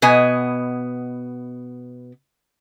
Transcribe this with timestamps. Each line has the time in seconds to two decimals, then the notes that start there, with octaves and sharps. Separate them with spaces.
0.02 B2 B3 D#5 G#5